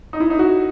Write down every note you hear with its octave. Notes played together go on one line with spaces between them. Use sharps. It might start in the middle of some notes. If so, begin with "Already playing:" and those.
D#4
E4
D#4
F#4